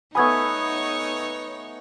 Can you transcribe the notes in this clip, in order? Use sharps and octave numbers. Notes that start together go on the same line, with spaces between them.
A3 B3 D#4 C#5 G#5 B5 D#6 G#6